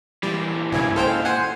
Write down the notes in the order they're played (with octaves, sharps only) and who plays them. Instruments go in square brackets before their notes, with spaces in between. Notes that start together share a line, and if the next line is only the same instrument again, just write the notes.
[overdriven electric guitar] A#2 E3 [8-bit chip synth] G3
[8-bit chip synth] B1 G2 C#3 [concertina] E4 G#5
[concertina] G#3 F5 F6 [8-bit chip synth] A4 C5 G5
[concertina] C5 [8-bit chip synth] F#5 G#5